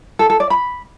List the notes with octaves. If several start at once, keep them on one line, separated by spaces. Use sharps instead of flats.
A4
A4
D5
B5